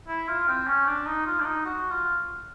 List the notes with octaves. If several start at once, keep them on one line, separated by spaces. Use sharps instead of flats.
E4
F4
C4
C#4
D4
D#4
F4
D4
D#4
F#4
F4